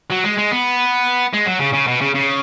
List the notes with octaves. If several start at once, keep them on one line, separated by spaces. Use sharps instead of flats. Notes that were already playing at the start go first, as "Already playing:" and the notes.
F#3
G#3
G#3
B3
G#3
F#3
C#3
C#3
B2
C#3
C#3